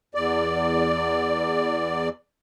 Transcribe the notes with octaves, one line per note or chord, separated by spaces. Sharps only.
E2 D5